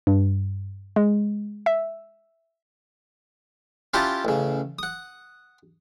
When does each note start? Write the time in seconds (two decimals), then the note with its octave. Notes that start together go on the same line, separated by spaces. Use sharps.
0.07 G2
0.96 G#3
1.66 E5
3.94 C#4 E4 F4 G4 F#5 A5
4.25 A1 C#3
4.79 F#5 D#6